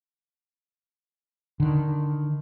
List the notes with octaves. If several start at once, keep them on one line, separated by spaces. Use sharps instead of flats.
D3 D#3